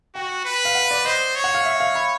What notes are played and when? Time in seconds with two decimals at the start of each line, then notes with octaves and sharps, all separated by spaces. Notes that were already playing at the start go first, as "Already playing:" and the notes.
0.15 F#4 G5
0.45 B4
0.65 F5
0.75 F#5
0.91 D5
1.05 C5 D#5
1.36 C#5
1.44 F#5
1.55 F5
1.65 E5
1.80 F5
1.95 B5